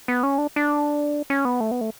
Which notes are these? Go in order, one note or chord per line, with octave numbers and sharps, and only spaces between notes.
B3
C#4
D4
D4
C#4
B3
A3
B3
A3